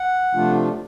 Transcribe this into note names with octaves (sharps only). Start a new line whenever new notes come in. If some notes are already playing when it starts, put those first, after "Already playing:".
Already playing: F#5
C3 F3 A3 D4 F4